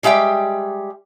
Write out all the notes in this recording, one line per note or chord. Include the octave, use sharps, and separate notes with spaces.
G3 G#3 G4 E5 G5